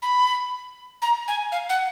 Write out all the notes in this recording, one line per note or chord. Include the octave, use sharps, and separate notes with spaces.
B5
A#5
G#5
F5
F#5